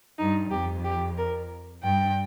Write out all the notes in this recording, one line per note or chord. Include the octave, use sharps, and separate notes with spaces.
G2 D#4
F2 G4
G4
A#4
G2 G5